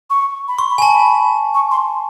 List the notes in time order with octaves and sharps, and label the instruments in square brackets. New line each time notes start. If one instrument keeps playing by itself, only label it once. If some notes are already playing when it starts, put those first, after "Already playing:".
[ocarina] C#6
B5
[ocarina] C6 [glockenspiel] C#6
[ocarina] B5
[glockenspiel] G#5
A5
[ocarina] B5
C#6
C6